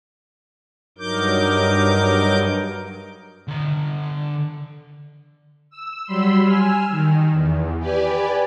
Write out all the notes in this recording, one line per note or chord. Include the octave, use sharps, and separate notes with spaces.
G2 F#3 D#4 A#4 D6 G6
D3 A#5
E6
F#3 G3 B5 C6 E6
G#5 E6 F6
D#3
E2
G4 B4 D5 G#5